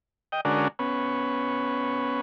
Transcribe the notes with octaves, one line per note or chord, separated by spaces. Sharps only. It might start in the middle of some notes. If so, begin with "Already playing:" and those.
D#5 G5
D3 G#3 C#4 D4 F#4 A#4
B3 C#4